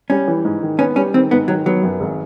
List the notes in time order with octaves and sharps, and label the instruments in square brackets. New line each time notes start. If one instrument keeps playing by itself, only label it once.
[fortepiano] G3 [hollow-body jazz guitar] C#4
[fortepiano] E3
G#2
D#3
[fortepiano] B3 [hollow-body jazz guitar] C#4
[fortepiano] G3 [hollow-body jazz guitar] C#4
[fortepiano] D#3 [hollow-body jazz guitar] C4
[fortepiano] G#2 [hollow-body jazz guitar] B3
[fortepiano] D#3 [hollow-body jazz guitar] F#3
[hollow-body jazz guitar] F#3 [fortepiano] B3
[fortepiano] F#2
G#1